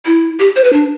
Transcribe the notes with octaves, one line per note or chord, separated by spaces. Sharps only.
E4
G4
C5
B4
D4